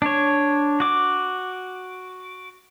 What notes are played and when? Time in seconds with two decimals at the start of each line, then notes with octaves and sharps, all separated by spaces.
0.02 D4 C#5
0.80 F#4 D6